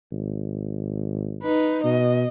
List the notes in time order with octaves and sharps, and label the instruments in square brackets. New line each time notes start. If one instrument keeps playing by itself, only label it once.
[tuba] G#1
[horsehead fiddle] D#4 B4
[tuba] B2 [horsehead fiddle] D#5